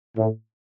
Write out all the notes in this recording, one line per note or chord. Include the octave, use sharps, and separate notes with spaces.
A2